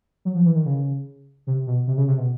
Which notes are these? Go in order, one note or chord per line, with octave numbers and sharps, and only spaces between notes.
F#3
F3
E3
D#3
C#3
C3
B2
C3
C#3
C3
B2